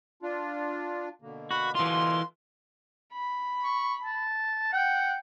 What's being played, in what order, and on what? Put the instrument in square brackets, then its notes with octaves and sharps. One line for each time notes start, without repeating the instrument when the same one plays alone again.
[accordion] D4 F4
B2 D3 A#3
[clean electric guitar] F#4 [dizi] B5
[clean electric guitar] E3 F4 [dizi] C6
[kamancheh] B5
[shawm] C#6
A5
[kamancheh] F#5 [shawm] G5